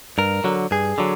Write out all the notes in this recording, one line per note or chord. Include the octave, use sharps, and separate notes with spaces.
G2 A#4
D3 F#3
G2 G#4
D3 F#3